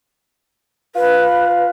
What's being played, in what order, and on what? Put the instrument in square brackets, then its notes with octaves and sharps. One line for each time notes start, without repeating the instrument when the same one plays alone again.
[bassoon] F4 [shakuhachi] B4